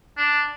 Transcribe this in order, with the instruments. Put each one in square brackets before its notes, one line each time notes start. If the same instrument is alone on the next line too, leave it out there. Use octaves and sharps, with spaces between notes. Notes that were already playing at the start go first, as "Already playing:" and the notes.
[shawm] D4